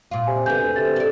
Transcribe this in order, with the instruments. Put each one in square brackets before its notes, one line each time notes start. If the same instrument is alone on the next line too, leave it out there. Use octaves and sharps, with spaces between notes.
[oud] A#2 F4
[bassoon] C3 [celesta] G#5
[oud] D3 B3 [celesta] G#5 G6
[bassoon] D2
[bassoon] C3 [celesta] A6
[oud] A4 D5